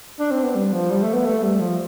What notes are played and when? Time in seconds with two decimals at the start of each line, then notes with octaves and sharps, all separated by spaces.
0.19 D4
0.31 C4
0.43 B3
0.55 G3
0.73 F3
0.90 G3
1.02 A3
1.14 B3
1.25 A3
1.43 G3
1.60 F3